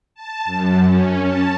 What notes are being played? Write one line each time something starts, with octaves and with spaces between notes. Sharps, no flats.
A5
F#2
C#4
A5